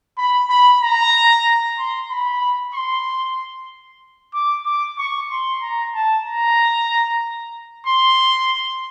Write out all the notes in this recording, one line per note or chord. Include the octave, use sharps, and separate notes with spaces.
B5
B5
A#5
C6
B5
C6
D6
D6
C#6
C6
A#5
A5
A#5
C6